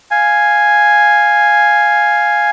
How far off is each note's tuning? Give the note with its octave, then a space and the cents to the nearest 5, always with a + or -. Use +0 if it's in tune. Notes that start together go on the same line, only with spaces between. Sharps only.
F5 +0 G#5 +0